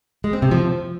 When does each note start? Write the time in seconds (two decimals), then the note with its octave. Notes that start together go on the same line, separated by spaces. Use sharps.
0.24 G#3
0.33 C4
0.42 C3
0.51 F3